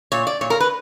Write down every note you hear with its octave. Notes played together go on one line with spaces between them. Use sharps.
A#2 C#5
D5
A#2 C#5
A#4
B4